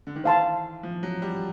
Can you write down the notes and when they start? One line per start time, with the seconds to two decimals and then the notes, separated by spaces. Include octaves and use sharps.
0.07 D3
0.16 D#3
0.24 E3 C5 F5 A5 C6
0.83 F3
1.03 F#3
1.22 G3